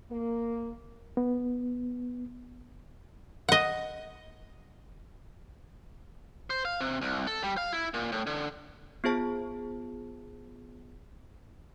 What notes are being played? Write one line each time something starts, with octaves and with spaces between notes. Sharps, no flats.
A#3
B3
D#5 F#5
C5
F5
C3
C2
A4
G3
F5
E4
A#2
A2
D3
B3 F4 G#4 C5 A5